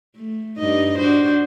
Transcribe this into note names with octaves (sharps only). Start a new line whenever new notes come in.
A3
G2 D#4 D#5
D4 F#4 C5